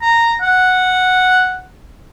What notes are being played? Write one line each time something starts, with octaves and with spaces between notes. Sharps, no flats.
A#5
F#5